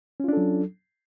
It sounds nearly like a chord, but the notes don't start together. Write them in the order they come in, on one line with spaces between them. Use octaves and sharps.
C#4 F4 D4 A4 F#3